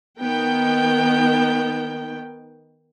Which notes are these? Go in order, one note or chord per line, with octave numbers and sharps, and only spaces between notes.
D#3 B3 G5